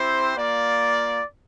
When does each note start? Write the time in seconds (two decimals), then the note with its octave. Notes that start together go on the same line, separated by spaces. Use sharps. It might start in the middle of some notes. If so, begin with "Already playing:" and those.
Already playing: C4 E4 G4 C5
0.37 A#3 F4 D5